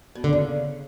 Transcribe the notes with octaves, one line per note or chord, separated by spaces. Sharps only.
B2
D3
C#3